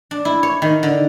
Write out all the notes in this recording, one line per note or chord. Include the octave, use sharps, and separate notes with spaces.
D4
E4
C#5
D#3
D3